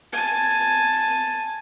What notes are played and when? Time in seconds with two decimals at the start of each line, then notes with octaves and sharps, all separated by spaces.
0.13 G#5 A5